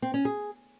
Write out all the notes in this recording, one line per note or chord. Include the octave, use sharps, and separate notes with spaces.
C4
C#4
G#4